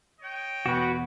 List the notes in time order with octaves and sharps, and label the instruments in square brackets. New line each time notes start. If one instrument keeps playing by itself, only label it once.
[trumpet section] C#5 D#5 G5
[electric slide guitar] E2 B2 B3 [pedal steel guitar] F#4 B4